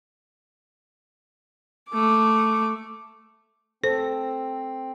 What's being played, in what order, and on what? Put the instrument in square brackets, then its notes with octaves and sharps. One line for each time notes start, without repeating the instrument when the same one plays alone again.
[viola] A3 D6
[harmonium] C4 [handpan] A4 [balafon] C5